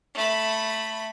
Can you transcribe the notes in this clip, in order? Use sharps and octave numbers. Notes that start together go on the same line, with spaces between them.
A3 B5